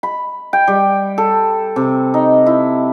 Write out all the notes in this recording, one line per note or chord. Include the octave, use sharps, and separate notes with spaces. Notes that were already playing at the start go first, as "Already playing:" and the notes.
B5
G5
G3
A4
C3
D#4
E4